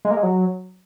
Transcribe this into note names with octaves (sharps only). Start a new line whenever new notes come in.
G#3
A#3
G#3
F#3